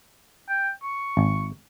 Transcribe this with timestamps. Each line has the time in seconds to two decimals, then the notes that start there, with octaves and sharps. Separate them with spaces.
0.48 G5
0.83 C#6
1.17 G#1